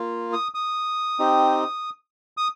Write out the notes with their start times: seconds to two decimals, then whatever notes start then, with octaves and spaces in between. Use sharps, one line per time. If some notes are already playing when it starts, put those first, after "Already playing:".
Already playing: A#3 F4
0.33 D#6
0.55 D#6
1.19 C4 D#4 G4
2.37 D#6